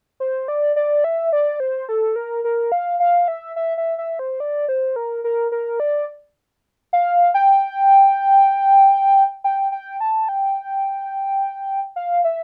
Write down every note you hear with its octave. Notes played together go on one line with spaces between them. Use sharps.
C5
D5
D5
E5
D5
C5
A4
A#4
A#4
F5
F5
E5
E5
E5
E5
C5
D5
C5
A#4
A#4
A#4
D5
F5
G5
G5
G5
A5
G5
F5
E5